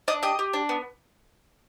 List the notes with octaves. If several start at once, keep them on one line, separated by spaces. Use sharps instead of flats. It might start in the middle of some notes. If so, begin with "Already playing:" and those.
D4 D#5 D#6
G4 D#5 D#6
G4
D4
B3